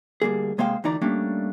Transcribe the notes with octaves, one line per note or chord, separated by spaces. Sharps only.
D2 G3 A#3 G#4
C3 G#3 A#3 C5 F5 G5
D2 E3 D#4 D5 A#5
G3 A3 A#3 C#4 D4